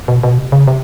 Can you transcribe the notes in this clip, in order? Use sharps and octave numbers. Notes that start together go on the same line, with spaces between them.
B2
B2
C3
C#3
C3